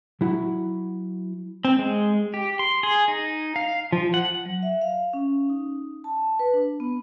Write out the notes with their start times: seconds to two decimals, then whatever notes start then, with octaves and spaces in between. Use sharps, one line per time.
0.21 F#3 E4 F#4 F#5
1.65 C4
1.79 G#3
2.34 G4
2.59 C6
2.83 G#4
3.08 D#4
3.56 F5
3.93 F3
4.14 F#5
4.46 F#3
4.63 E5
4.81 F5
5.13 C#4
5.49 D#4
6.04 A5
6.39 B4
6.53 D4
6.80 B3